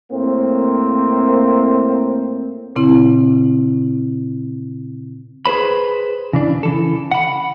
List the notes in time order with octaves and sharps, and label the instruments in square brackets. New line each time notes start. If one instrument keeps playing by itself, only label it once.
[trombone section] A2 A#3 C4
[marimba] A#2 C#3 C4 E4
[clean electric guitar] G#4 B4 C5 B5
C#3 E3 D4
C#3 E3 A4
F#5 B5